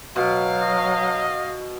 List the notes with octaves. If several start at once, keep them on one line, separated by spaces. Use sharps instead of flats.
B2 F#3 F5
D#5